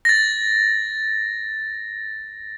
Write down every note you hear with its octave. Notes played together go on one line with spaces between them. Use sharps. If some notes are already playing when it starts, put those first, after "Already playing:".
A6 A#6